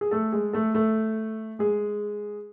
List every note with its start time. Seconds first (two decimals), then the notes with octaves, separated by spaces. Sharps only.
0.01 G#4
0.11 A3 A4
0.32 G#3 G#4
0.53 A3 A4
0.75 A3 A4
1.59 G#3 G#4